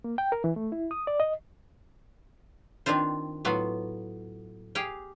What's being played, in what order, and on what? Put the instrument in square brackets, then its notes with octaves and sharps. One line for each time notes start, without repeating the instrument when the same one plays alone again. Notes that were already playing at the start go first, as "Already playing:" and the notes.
[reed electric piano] A#3
G5
A#4
E3
A3
E4
D#6
D5
D#5
[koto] D#3 C4 D4 F4 C5
A2 F#3 B3 F4
G4 G#4 F5 G5